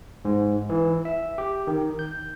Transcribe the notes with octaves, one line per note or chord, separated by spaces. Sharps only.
G#2
E3
E5
G4
D#3
G6